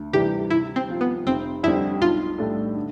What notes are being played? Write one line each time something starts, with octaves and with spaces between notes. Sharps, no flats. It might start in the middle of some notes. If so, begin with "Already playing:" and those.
Already playing: D2
C3 E3 G3 G4
C3 E4
C4
F3 C4 F4
B3
F1 C4
F2 D3 G3 C4 E4
B1 F4
A2 G3 D4 A4
D3